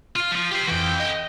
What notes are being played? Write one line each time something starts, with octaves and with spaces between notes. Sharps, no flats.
F4 F5
F3 F4
G4 C5
F2 E3 F#4 G5
D#5